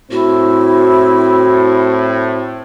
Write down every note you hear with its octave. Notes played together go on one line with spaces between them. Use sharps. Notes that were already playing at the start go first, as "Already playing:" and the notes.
A2 C4 E4 F#4